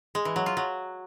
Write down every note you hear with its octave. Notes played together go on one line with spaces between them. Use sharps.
G#3
E3
F#3
F4
F#3